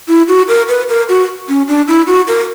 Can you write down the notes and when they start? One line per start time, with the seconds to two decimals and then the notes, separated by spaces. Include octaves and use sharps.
0.08 E4
0.28 F#4
0.48 A#4
0.68 B4
0.89 A#4
1.09 F#4
1.49 C#4
1.68 D4
1.88 E4
2.07 F#4
2.28 A#4